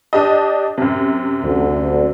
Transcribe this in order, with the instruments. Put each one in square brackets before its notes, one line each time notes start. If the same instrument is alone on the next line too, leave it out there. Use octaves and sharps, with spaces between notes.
[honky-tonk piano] D4 G4 D#5
F#2 C3
[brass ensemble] D2